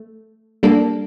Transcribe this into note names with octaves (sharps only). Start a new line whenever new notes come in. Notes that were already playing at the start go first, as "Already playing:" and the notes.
Already playing: A3
G3 A#3 D4 A4